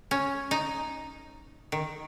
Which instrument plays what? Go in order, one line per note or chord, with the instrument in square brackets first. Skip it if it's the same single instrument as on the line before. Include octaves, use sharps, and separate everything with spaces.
[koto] C#4
D#4
D#3